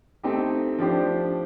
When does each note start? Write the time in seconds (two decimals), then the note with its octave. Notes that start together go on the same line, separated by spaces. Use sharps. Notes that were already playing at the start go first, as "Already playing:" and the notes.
0.23 A3 C4 D#4 G4
0.79 F3 A3 D4 G4 C5